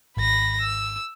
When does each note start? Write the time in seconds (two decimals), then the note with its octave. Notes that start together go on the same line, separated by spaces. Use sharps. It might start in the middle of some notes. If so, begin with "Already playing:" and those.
0.17 G#1 B5 A#6
0.61 E6